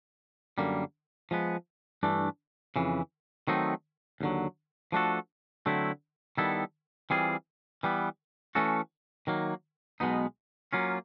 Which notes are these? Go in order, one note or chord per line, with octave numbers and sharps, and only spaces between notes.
F#2 D3 G3 A#3
F3 G#3 B3
G2 E3 A3 D4
F2 C#3 E3
D#3 F#3 A3 C4 D#4
D#2 D3 F#3
F3 A3 D4 F#4 A4
D3 F#3 A3 C4 E4
D#3 G3 B3 E4 A4
E3 G3 C4 F4 G#4
E3 G3 B3
E3 A3 C#4 F#4 A4
D#3 F#3 A#3
B1 B2 G#3 B3 D#4
F#3 A#3 C#4 F4